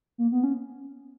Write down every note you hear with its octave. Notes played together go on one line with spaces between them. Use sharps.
A#3
B3
C#4